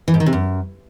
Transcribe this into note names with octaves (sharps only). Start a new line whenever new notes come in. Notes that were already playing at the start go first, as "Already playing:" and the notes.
E3
G#2
D#3
C3
F#2